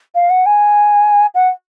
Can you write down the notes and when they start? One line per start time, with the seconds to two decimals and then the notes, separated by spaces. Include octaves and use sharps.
0.15 F5
0.30 F#5
0.46 G#5
1.35 F#5